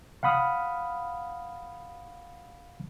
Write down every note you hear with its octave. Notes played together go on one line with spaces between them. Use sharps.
F5 F#5 B5 D#6 F6